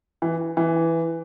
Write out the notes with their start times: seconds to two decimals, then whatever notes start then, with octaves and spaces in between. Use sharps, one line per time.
0.22 E3
0.57 E3